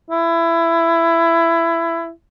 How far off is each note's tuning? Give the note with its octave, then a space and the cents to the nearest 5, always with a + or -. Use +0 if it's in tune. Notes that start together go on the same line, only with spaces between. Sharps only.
E4 +20